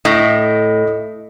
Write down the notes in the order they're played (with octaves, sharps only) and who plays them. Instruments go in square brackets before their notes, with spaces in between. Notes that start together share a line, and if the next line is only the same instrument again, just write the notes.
[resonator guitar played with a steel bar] A2 [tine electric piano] D#5